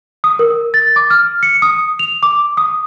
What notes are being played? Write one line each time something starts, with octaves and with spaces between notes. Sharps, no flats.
D#6
A#4
A6
D6
F6
C#7
D#6
F7
D6
D#6